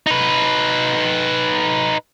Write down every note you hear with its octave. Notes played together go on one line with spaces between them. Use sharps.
D#4 B4